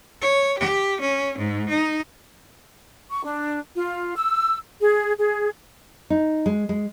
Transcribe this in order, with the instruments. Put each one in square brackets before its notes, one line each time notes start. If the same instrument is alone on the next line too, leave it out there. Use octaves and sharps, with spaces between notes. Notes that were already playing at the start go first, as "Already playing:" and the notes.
[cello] C#5
G4
C#4
G#2
D#4
[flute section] C#6
D4
F4
E6
G#4
G#4
[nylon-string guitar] D#4
G#3
G#3